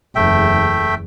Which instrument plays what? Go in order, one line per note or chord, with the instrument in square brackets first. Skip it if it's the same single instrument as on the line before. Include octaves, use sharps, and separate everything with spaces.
[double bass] F#1 E2 [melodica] A3 E5 G5